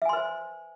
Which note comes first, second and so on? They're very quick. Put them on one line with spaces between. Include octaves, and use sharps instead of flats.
E5 G#5 C6 B4 C5